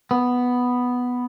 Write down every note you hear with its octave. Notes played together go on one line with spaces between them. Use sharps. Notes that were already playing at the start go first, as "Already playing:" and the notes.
B3